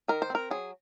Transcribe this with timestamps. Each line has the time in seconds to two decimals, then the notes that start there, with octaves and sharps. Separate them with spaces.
0.08 D#3 A#4
0.22 C5
0.30 C4 A#4
0.51 F#3 G#4